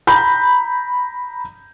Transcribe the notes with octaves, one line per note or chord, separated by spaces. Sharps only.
A#5 B5 G6